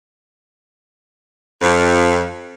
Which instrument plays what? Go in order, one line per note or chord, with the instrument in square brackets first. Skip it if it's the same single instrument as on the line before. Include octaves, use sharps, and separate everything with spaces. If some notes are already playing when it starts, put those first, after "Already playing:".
[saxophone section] F2